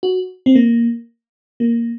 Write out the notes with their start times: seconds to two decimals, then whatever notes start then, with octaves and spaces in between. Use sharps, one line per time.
0.03 F#4
0.46 C4
0.56 A#3
1.60 A#3